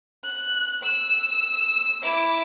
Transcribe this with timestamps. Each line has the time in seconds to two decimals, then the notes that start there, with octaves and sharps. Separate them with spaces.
0.24 F#6
0.83 E6
2.03 E4 D6